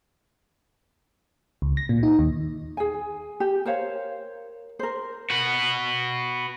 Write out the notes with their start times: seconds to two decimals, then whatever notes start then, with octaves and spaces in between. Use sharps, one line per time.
1.62 C#2
1.77 A#6
1.89 A#2
2.03 D#4
2.19 D#2
2.77 G#4 G#5
3.40 G4
3.66 A#4 C5 C#5 F5
4.79 A#4 C5
5.30 F#4 B4